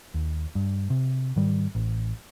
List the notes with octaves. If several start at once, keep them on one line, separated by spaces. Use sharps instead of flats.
D#2
G2
C3
G#2 D#3 G3
A1